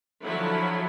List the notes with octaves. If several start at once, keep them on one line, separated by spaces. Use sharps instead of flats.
D3 F3 F#3 E4 A4 B5